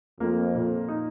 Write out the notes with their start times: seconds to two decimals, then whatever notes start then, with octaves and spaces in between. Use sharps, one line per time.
0.20 F2 A#3
0.55 A#2
0.88 D#4